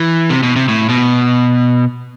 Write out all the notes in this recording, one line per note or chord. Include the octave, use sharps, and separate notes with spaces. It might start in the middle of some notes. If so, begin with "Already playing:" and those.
Already playing: E3
C3
B2
C3
A2
B2